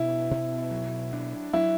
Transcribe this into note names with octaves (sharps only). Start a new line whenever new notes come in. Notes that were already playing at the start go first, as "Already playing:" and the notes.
Already playing: B2 D4 E4
B2
F#3
D4
F#3 E4